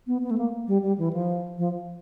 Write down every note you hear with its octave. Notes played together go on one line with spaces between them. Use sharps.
B3
B3
A3
A#3
G3
G3
E3
F3
F3